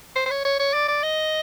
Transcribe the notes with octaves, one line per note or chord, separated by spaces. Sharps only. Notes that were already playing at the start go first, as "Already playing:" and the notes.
C5
C5
C#5
C#5
C#5
D5
D5
D#5